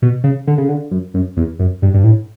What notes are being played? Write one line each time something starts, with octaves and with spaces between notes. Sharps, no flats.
B2
C#3
D3
C#3
D3
F#2
F#2
E2
F#2
G2
G2
A2